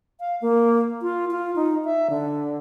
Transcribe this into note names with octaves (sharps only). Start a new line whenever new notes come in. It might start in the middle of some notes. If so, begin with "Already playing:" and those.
F5
A#3
F4
F4
D#4
E5
D3